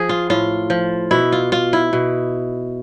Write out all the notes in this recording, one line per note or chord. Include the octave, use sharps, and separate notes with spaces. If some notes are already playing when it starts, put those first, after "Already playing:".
Already playing: F3 G#4
F4
A2 F4
F3
B2 E4
F4
F4
E4
B2